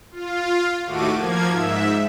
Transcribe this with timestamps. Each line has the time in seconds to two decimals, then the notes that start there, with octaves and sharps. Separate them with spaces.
0.12 F4
0.85 D#2 A2 A3 F#4 D6 D#7
1.16 F3 A#3 G#6
1.48 G#2 E5